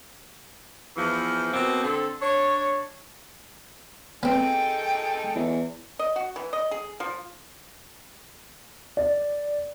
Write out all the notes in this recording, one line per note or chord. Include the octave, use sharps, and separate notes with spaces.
E2 E3 F3
B2 A#3 C4
D3 C4 A4
D4 C#5
B3 C4 D#4 G#4 A4 G5
E2
D#5
F#4
E3
D#5
G#4
F3
D5